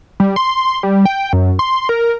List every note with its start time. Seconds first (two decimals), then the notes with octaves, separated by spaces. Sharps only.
0.20 G3
0.36 C6
0.83 G3
1.05 G5
1.33 F#2
1.59 C6
1.89 A#4